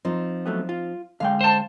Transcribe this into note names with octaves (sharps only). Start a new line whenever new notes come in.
F3 C4 D#4
F#3 A3 B3
F4
D3 G#3 F5 G5
C5 A5